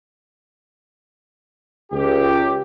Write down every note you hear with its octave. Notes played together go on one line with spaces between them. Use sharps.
C#2 G4